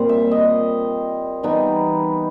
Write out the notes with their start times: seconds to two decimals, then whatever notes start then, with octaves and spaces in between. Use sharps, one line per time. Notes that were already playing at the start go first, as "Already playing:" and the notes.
Already playing: A#2 G3 C4
0.09 E5
0.31 D#5
1.43 E3 G3 B3 D#4